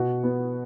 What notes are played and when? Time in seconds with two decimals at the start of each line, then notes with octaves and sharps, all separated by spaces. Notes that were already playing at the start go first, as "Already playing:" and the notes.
Already playing: B2 F#4 F#5
0.23 B3